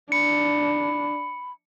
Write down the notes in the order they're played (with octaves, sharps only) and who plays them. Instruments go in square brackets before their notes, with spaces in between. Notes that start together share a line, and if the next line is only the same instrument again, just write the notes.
[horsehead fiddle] D4 [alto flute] B5 [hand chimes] C#7